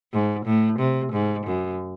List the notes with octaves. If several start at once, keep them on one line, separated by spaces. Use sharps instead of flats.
G#2
A2
C3
G#2
F#2